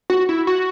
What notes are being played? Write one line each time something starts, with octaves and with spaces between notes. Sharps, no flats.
F#4
E4
F#4